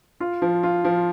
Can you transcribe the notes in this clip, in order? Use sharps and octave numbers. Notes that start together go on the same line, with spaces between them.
F4
F3
F4
F3